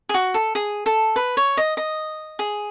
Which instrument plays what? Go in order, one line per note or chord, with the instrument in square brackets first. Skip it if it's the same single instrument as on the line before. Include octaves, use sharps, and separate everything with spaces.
[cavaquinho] G#4
F#4
A4
G#4
A4
B4
C#5
D#5
D#5
G#4